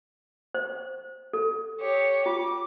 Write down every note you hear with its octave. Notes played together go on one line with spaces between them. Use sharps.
C5
A4
G4 C#5
F4 D6